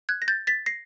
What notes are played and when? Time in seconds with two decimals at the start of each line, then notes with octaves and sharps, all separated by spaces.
0.09 F#6 G#6
0.22 A#6
0.28 G6 A6
0.47 A6 B6
0.66 A#6 C7